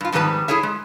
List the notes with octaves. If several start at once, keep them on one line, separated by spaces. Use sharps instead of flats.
G2 F4
F2 G#2 D#3 G3 B4 A5
E4 G#4 A4 C#5 E5
G#3